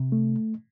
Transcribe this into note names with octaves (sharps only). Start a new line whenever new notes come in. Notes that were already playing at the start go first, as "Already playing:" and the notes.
Already playing: C3
A3